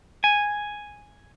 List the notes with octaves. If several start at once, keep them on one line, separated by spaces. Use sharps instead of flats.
G#5